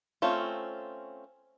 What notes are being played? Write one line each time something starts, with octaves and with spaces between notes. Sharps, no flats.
A3 C4 C#4 F4